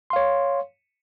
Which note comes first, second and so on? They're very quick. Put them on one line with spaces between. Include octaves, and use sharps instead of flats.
C6 F5 C#5